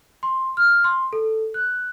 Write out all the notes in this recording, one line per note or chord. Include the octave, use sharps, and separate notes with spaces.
C6
F6
C6
A4
F#6